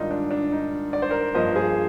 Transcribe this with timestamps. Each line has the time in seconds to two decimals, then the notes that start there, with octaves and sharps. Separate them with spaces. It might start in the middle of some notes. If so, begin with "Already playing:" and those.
Already playing: G#2 D#3 G3 D4 D#4 F4
0.11 D4
0.31 D4
0.52 D#4
0.93 D5
1.02 C5
1.10 A#4 D5
1.35 G2 F3 A#3 C5 D#5
1.56 G#4 C5